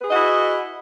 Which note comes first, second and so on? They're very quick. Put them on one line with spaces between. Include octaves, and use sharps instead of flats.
B4 G#4 D#5 F#4 E4